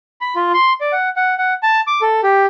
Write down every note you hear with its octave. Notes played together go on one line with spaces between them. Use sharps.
B5
F4
C6
D5
F#5
F#5
F#5
A5
D6
A4
G4